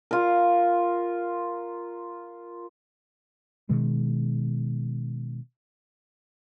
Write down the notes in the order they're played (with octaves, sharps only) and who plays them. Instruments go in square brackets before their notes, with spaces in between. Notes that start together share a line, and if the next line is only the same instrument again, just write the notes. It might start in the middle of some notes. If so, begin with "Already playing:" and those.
[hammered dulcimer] F4 A#4
[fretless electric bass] B2 D#3 G#3